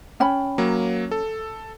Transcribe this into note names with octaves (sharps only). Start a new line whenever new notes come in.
C#4 G5 B5
F#3 A#3
A4